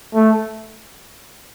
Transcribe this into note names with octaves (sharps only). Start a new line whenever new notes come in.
A3